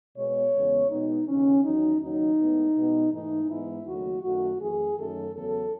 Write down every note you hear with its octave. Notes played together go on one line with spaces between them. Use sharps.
B2 G#3 B3 C#5
E2 C#3 G#3 B3
B2 G#3 B3 D#4
D#2 C#3 E3 C#4
E2 D#3 F#3 D#4
D#2 C#3 F#3 D#4
A2 G#3 B3
B2 G#3 B3
G#2 E3 A3 D#4
G#2 E3 G#3 B3 E4
D#2 C#3 F#3 A3 F#4
F#2 D#3 A3 F#4
F#2 E3 A3 G#4
F#2 D#3 F#3 A3 A4
E2 C#3 F#3 B3 A4